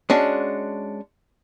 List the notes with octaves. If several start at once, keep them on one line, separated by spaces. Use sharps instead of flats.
G#3 C#4 D4 F#4